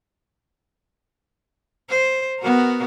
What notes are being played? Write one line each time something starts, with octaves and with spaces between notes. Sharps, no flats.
C5
B3 F#4 A#4